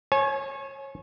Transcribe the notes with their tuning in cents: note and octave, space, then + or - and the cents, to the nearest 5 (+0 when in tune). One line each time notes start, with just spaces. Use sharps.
C#5 -25 G#5 +30